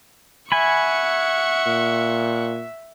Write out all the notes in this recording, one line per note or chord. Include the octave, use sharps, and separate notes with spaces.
E5 F#5 G#5 B5 C#6
A#2